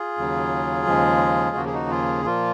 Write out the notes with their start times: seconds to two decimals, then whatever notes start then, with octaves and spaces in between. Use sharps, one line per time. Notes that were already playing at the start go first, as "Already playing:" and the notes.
Already playing: F4 G#4
0.17 D#2 C#3 F#3
0.86 D#2 C#3 F3 G#3
1.56 D#2 C#3 F3 A#3 F#4
1.66 G#4
1.73 D#4 F#4
1.90 F4 G#4
2.24 A#2 F3 A#3 F4